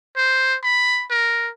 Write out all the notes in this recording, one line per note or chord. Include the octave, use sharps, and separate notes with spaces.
C5
B5
A#4